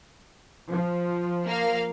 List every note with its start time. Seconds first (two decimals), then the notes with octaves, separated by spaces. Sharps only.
0.69 F3
1.45 A#3 F5